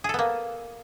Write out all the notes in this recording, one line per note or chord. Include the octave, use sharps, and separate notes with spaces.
A#3 B3 G#4 A4